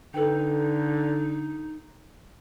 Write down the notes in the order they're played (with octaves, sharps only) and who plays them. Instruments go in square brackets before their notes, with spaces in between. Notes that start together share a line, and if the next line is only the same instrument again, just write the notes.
[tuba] D3 [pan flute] D#4 [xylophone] A4 B4 G5